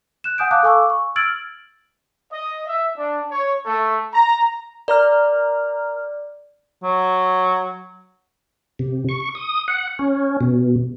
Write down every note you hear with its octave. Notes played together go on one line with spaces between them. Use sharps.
F#6 E7
F#5 G#5 D#6 G6 D7
F5 A5 D6 D#6 F#6
A4 F5 G#5 C#6 D6 E6
C#6
E6 F6 G#6 A6 D7 F#7
D#5
E5
D4
C#5
A3
A#5
A#4 D5 A#5 F6
F#3
C3
C#6
D#6
F#5
C#4
B2